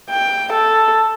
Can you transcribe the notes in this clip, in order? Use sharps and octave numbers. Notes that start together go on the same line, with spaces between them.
G5
A4